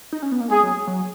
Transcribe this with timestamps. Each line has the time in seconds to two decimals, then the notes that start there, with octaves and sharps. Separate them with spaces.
0.12 D#4
0.22 C#4
0.32 B3
0.40 A#3
0.50 G#3 G#4
0.63 F#3
0.87 F#3